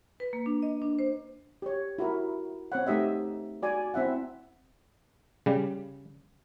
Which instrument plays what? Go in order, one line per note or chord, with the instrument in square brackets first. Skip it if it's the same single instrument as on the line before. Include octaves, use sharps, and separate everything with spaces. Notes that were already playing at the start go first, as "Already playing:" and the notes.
[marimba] B4
A#3
D4
D#5
D4
C5
[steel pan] G4 C#5
E4 F#4 A#4
C4 C#5 F#5
A3 D#4 G4 D#5 E5
F#4 D5 G#5
C4 E4 E5 F#5
[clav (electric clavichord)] C#3 G3